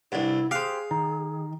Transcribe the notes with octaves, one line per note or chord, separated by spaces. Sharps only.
C2 G2 E4 F#5
G4 G#4 C5 F5 F6 F#6
D#3 A#5